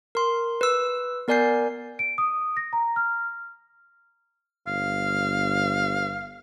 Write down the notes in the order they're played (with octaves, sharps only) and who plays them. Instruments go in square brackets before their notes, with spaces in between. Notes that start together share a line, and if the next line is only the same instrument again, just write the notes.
[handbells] A#4 C6
B4 E6
B3 A#4 D5 G#5 G6 C7
[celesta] D7
D#6
A#6
A#5
F6
[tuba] G1 [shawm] F5